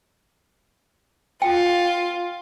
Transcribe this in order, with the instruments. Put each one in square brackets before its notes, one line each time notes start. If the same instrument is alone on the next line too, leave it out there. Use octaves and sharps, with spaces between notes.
[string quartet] F4 [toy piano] G5